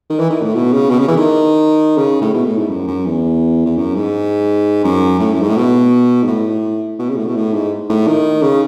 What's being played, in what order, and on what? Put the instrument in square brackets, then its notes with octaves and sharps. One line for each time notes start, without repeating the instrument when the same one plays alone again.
[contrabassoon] D#3
E3
D#3
A2
B2
C#3
B2
C#3
E3
D#3
C#3
A2
B2
A2
G#2
F#2
F#2
E2
E2
F#2
G#2
F#2
A2
F#2
G#2
A2
B2
G#2
A2
B2
C#3
A2
B2
A2
G#2
A2
D#3
C#3